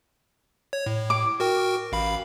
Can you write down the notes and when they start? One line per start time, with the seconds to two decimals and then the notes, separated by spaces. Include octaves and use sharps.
0.73 C#5
0.86 A2
1.10 D6
1.40 F#4 A#4 G5
1.92 A1 F5 B5